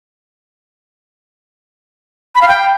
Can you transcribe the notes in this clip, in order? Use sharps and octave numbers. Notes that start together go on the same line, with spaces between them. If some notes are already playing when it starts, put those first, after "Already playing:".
B5
F5
G5